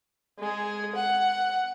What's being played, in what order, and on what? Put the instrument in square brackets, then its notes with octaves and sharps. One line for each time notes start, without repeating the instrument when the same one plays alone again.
[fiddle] G#3 G#4
F#5